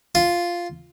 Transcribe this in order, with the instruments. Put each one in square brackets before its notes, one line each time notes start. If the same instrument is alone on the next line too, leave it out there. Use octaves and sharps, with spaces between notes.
[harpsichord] F4